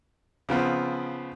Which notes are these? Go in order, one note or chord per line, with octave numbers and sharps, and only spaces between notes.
C#3 F3 B3 C4